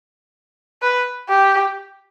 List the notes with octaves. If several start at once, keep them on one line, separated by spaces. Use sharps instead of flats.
B4
G4